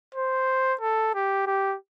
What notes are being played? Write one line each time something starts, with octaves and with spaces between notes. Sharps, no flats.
C5
A4
G4
G4